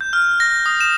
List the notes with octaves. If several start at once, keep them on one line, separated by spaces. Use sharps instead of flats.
G6
F6
A#6
D#6
E7